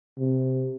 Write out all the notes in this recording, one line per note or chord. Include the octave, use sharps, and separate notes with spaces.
C3